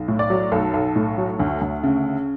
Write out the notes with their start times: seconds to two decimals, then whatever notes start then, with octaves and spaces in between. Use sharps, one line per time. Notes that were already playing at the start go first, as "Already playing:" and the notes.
Already playing: B1
0.08 A2
0.19 D5
0.30 F#3
0.52 B1 A4
0.74 B1
0.96 A2
1.18 F#3
1.40 D2
1.61 D2
1.83 C#3